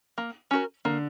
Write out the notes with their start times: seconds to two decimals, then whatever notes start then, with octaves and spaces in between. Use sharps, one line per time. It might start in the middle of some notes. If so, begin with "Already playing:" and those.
0.18 A#3
0.51 C#4 F#4 A#4
0.85 D3 A#3